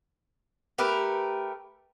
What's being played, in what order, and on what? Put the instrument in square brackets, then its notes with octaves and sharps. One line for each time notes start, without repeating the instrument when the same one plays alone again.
[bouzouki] A3 G4 A#4 B4